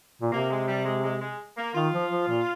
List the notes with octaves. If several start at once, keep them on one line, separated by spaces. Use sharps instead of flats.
A#2
C3 A#3
G#3
G3
G#3
G#3
G#3
A#3
D#3 F4
F3
F3
A#2